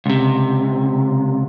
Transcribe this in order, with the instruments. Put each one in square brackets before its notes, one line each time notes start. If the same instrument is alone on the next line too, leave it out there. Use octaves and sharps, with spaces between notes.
[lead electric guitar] C#2 C3